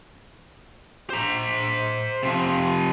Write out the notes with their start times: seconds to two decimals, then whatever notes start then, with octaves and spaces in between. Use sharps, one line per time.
1.10 C5 A#5
2.23 C3 F3